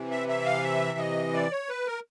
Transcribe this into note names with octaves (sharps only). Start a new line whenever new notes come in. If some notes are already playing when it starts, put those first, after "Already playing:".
Already playing: C3 E3
E5
E5
F5
E5
D#5
D5
C#5
B4
A#4